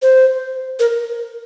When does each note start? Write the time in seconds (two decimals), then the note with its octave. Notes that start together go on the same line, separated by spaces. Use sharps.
0.02 C5
0.80 A#4